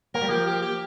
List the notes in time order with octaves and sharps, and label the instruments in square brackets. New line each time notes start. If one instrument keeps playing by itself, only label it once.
[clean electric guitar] A#3 [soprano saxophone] A#4
[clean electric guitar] G3
[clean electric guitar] F3 A#3 [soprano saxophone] G4
[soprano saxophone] G4
G4